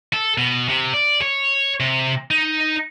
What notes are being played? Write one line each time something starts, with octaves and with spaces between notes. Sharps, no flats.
A4
B2
C3
D5
C#5
C3
D#4